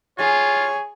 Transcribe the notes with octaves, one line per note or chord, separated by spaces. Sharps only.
F4 G#4 C#5